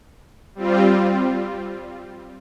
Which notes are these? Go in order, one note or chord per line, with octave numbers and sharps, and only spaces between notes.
G3 C4 F4